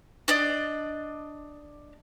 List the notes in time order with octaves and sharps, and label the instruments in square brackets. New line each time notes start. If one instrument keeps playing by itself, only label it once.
[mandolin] D4 D5 D#5